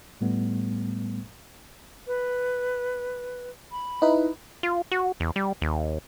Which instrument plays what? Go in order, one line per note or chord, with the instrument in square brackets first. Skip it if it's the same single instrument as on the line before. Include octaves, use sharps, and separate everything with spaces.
[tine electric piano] A2 G3 A3 B3
[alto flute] B4
B5
[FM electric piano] D#4 E4 B4
[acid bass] F4
F#4
E2
G3
D#2